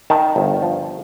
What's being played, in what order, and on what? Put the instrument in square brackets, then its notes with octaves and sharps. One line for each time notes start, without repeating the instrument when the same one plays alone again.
[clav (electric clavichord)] D#3 G5 A5
G1
F3